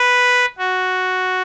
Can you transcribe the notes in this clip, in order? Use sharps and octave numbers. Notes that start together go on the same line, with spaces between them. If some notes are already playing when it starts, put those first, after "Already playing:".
Already playing: B4
F#4